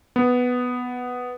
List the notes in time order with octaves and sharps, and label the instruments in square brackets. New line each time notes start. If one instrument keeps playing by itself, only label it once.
[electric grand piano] B3